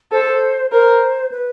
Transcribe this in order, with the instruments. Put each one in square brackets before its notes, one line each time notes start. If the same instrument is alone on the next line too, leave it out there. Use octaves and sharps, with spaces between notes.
[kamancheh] A4 [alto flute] C5
[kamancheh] A#4 [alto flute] C5
[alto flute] B4